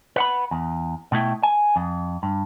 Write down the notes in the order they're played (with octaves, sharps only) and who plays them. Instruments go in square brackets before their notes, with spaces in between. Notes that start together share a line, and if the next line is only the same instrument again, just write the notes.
[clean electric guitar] B4 F#5 B5
E2
B2 A3 E4 G5
G#5
F2
G2